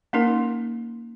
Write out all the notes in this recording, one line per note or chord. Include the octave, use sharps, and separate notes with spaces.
A#3 C#4 D#4 A#4